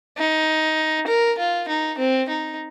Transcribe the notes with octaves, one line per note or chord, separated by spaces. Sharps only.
D#4
A#4
F4
D#4
C4
D#4